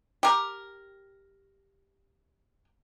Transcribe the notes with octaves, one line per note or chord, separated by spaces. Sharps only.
G4 A#4